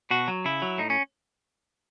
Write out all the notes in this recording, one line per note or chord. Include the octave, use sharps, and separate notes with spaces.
B2 F#4
F#3
C#3 E4
F#3
A2 D#4
C#4